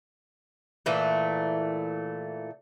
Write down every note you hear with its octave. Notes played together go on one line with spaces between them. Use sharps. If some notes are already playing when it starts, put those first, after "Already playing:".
A#2 E3 A3